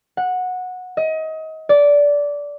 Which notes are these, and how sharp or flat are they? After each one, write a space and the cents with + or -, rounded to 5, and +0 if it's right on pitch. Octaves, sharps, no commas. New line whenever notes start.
F#5 -15
D#5 +30
D5 -15